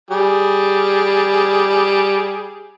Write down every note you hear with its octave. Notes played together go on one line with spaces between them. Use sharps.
G3 G#4